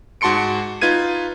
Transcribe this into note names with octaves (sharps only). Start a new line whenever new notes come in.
G#2 F#4 A5 C6 C#7 D7
D#4 F4 B4 G#6 D#7